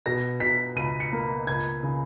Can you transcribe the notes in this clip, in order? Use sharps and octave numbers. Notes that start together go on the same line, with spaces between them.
B2 A#6
B2 B6
C#2 D#7
C#7
A#3
C#2 G#6
C#3